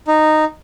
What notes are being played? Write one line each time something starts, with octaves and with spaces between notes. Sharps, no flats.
D#4